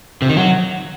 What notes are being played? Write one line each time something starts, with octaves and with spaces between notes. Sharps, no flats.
C3
D#3
F#3